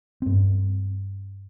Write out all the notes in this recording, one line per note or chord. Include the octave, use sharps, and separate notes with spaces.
G2 C4